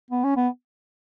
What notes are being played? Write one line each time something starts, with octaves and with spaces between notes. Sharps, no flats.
B3
C#4
B3